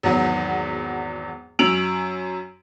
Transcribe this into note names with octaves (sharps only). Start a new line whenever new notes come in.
G#1 E2 F#3 B3
F#2 C#4 E6 D7 F7 F#7